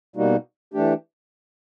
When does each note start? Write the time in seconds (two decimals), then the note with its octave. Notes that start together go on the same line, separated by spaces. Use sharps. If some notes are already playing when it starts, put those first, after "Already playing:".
0.16 B2 G3 A#3 D#4 F#4
0.74 E3 A3 D4 G4